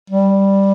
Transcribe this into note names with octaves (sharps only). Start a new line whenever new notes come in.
G3